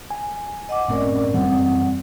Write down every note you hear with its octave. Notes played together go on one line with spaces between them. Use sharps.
G#5
D#5 F#5 D6
F#1 A2 C4 C#4 A#4 D5
F#2 E3 G3 C4 F#5